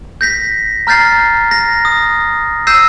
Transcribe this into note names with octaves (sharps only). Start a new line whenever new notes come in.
G6 A#6 B6
A#5 F6 G6 A6 C7
A#6
D#6
E6 G6 A#6 C7 D#7 E7